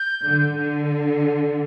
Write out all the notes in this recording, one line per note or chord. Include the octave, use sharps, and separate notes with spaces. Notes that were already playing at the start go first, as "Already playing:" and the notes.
Already playing: G6
D3
D3